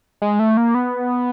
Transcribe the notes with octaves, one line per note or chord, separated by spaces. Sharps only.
G#3
A3
A#3
B3